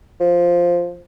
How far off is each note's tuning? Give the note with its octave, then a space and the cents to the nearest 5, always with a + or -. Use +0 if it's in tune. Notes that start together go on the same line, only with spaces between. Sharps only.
F3 +0